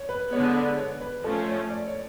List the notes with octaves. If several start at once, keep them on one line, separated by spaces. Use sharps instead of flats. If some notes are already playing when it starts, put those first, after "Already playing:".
Already playing: C#5
B4
D3 G#3 B3 C#5
D5
C#5
B4
F3 A3 C#4 A4
C#5
D5
C#5